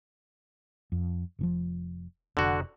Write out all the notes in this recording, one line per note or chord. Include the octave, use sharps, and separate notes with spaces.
F2
F1 C3 F3
F1 D3 F#4